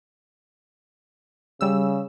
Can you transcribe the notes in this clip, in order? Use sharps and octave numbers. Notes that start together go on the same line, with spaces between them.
C#3 G3 E6